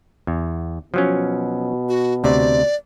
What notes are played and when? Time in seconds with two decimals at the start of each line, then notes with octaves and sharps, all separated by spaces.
0.27 E2
0.94 B2 F3 F#3 C#4
1.89 F#4
2.24 D2 C3 D5